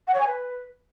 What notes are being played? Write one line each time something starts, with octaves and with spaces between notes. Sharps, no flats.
F#5
C#5
G#5
B4